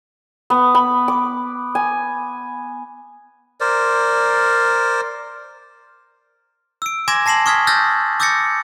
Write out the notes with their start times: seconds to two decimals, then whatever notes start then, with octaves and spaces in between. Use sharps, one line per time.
0.50 B3
0.75 B5
1.08 D6
1.75 G#5
3.60 A#4 C5 D5
6.82 E6 D7
7.08 G#5 C6 D6 G#6 A#6 E7
7.26 A5 A#6 C7 E7 F#7
7.46 C#6 D#6 F6 G#6 B6
7.67 E6 F6 G6 A6 A#6
8.20 D6 E6 G6 A6 A#6 C#7